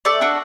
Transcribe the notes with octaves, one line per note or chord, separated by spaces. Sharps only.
A3 D5
D4 F#4 A4